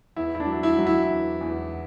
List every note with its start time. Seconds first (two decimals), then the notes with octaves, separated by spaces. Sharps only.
0.16 E2 E4
0.35 E4
0.40 D4
0.48 F#3
0.63 E4
0.78 F#3
0.87 E4
1.10 E2
1.41 E2